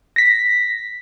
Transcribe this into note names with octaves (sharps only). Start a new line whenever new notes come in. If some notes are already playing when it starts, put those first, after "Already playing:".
A#6 B6